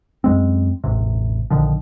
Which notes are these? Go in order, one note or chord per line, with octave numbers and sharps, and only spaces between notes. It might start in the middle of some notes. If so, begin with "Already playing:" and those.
F#2 G#3 C4
E1 A1 C3
A#1 D3 D#3 F3